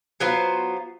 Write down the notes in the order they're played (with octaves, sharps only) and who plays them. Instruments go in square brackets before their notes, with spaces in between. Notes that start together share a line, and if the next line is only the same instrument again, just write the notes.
[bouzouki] F#3 B3 F4 C5